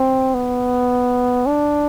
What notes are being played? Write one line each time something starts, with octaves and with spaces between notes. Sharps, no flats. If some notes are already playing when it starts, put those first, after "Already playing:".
Already playing: C4
B3
D4